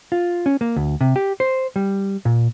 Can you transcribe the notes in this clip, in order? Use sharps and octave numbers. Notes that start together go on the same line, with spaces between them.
F4
C#4
A#3
D2
C3
G4
C5
G3
A#2